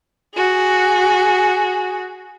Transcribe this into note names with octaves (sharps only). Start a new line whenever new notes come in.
F#4 G#4